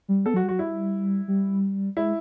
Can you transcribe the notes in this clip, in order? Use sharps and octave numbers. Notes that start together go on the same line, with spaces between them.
G3
B3 A4
F#3 F#4
G3
F#3 F#4
G3 E4
G3
G#3 E4